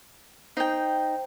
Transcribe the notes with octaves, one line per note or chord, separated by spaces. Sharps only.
D#4 C5 G5